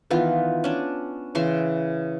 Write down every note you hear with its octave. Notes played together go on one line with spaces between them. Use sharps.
D#3 E3 B3 F4
C#4 D4
C#3 E3 C6